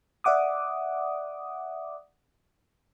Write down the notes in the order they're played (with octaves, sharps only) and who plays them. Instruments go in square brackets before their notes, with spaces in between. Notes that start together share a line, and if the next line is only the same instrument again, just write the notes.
[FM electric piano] D5 E5 F#5 D6 D#6